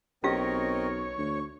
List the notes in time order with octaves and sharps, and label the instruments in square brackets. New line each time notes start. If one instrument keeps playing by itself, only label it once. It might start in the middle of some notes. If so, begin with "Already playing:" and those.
[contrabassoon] B1 [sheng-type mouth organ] C4 A#4 D#5 [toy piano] C#4 G4 F5 [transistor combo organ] C#5
[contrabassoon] D2 [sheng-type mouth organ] C#6